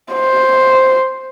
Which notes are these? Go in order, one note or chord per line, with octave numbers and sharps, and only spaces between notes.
C5